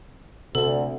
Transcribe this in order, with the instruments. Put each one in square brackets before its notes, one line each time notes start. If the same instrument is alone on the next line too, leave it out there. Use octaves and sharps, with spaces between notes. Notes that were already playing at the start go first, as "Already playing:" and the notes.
[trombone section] D2 [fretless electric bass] C3 [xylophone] A4